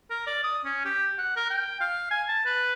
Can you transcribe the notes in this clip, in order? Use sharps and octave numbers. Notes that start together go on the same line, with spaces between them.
A#4
D5
D#6
C#4
G4
F#5
A#4
G5
F5
G#5
A5
B4